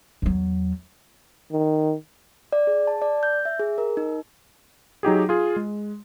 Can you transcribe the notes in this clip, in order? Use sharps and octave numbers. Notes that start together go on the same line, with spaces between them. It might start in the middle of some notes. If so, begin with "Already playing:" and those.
E2 F#3
D#3
D5
G#4
A5
D5
G6
E5
G#4
A#4
D#4
F#3 D#4 G4 G#4
F4 G#4
G#3